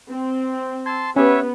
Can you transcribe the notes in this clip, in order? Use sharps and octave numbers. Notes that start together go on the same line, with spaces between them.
C4
A5 C6 E6 G#6
B3 C#4 G4 B4 C#5 E5